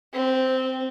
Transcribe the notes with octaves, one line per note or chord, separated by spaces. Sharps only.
C4